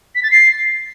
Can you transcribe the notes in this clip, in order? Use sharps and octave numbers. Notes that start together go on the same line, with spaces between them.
B6
A6
C7